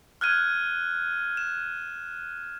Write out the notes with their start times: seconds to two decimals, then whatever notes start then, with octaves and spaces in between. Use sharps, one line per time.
0.21 F6 F#6 G#6 D#7
1.37 E7